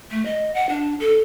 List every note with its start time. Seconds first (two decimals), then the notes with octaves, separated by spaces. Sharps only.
0.11 A3
0.25 D#5
0.55 F#5
0.69 D4
1.00 A4